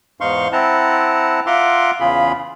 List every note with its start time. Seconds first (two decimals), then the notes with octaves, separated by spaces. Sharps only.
0.21 E2 G#2 D#4 F5 C6 C#6
0.52 C4 E4 F#5 A5 A#5
1.47 F4 E5 F#5 A#5 C6 D6
2.00 E2 C#3 F4 G#4 B5